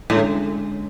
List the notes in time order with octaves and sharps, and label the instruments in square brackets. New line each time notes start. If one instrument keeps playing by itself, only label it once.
[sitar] A2 [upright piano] D3 G#3 C#4